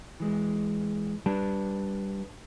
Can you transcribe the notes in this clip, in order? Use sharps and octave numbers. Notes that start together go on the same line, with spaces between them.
E3 G#3
G3 D4 B4 A5